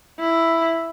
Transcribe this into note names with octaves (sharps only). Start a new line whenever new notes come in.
E4